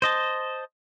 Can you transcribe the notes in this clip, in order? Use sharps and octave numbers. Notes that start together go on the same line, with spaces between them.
C5 D#5 A5